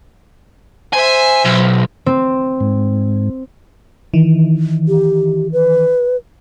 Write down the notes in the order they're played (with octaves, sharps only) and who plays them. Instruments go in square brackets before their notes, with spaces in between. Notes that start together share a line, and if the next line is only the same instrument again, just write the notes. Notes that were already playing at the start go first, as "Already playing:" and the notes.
[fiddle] C5 E5 [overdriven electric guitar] G#5
[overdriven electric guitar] B1
[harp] C4
[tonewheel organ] G#2
[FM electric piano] D#3 E3
[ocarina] G4
B4